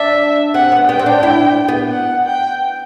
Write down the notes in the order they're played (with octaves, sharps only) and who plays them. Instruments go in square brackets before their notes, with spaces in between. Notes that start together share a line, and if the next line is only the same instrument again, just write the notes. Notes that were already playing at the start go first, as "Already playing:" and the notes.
Already playing: [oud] D4 [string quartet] E5
[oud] C4 [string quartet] F#5
[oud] B3
[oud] B3 [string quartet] G5
[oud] C4
D4
E4
B3
[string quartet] F#5
G5